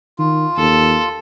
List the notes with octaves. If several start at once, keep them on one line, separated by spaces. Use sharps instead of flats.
D#3 F4
D#2 A4